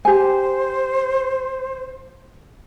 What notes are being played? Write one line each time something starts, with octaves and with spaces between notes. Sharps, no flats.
G4 C5 G#5